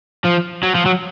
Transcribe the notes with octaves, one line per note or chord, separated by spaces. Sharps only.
F3
F#3
F3
F#3